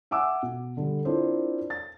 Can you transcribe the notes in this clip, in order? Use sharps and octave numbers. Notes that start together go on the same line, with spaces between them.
E5 F#5 G#5 D6 E6
B2
D3 G3
C4 D4 E4 F4 A#4 C5
A6